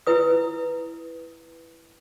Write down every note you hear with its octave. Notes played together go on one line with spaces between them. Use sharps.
E4 B4 D#6